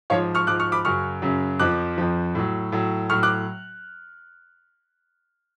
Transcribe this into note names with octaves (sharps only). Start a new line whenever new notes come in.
G#2 F3 C#5 F5
C#6 F6
G#2 F3 D6 F#6
C#6 F6
B5 D6
F#2 C#3 F#3 C#6 F6
F#2 C#3 F#3
F2 F3 D6 F#6
F2 F3
A2 F#3
A2 F#3
A2 F#3 C#6 F6
D6 F#6